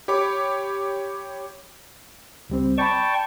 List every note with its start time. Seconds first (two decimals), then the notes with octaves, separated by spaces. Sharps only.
0.08 G4 C#5 B5 D6
2.50 C#2 G3 C4
2.78 D5 G5 A5 B5 C#6